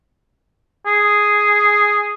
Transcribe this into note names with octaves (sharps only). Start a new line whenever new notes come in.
G#4